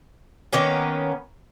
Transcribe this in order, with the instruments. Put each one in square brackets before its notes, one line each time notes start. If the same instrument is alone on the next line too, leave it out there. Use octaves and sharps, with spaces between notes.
[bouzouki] D#3 A#3 B3 C#4